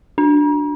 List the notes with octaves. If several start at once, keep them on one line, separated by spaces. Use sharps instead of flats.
D4